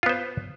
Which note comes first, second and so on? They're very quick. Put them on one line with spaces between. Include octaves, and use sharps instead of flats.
F4 B3 C5